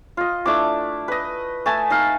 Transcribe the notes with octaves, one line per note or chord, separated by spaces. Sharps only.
F4 D#5
A3 D4 E4 D6
B4 D#5
A3 G#5 A5
D#4 F5